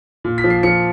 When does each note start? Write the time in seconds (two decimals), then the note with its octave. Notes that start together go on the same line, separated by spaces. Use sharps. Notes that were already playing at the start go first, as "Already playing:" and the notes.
0.24 A#2
0.38 B6
0.44 F3
0.50 C7
0.63 F3 C#7